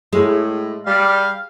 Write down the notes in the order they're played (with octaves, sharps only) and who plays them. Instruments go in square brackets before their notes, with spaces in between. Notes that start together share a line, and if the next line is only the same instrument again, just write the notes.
[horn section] A2 [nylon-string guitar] G#3
[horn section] G3 [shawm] F5